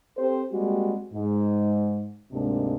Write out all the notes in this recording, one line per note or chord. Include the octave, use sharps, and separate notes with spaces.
C4 G4 A4 C5
G3 G#3 A#3 C4 F#4 G4
G#2 G#3
D2 G#2 C3 G#3 A#3 D4